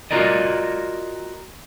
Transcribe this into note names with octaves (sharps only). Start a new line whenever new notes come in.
F4 F#4 A#4 D5 D#5